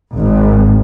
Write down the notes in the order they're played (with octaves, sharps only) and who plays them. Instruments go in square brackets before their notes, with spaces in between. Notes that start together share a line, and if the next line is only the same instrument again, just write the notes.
[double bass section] G#1